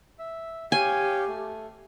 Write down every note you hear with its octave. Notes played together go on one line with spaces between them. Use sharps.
E5
G4 C#5 F5 G5 G#5
A3